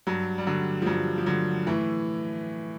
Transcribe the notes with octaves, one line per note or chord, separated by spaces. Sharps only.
G2 F#3
G3
D3 F#3
F3
G2 F#3
F3
D3 F#3
A2 E3